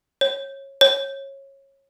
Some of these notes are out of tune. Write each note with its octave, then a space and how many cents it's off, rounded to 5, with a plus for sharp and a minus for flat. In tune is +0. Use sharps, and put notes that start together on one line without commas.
C#5 -20
C#5 -20